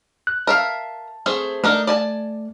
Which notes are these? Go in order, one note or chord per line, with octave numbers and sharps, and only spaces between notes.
F#6
A#4 E5 F5 A5
A3 C4 G#4
A3 D4 D#4 A#4
D5 G#5 A5